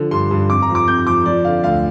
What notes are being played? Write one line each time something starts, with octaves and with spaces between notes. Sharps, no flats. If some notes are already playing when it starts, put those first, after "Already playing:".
Already playing: D3 F3
G2 C6
G2
F2 D6
A#5
F3
D6
F2 G6
F3 D6
F3 D5
D3 F5
D2 F5